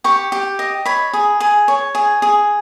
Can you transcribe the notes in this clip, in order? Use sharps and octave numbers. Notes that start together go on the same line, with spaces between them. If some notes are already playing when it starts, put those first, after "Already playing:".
G4 C#6
G4
D#5
C#5 B5
G#4
G#4
C#5
G#4
G#4